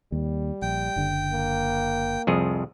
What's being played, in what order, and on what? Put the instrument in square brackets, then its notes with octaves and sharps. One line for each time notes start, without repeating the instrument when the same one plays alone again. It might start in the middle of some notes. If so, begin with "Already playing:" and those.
[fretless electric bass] D#2 [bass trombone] G3
[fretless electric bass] A#1 [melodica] G5
[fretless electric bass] F#1 D3
[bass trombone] A#3
[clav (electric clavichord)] C2 F2 G#4